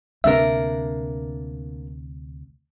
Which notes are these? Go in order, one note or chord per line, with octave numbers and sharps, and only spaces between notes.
D2 C3 A#3 D4 A#4 E5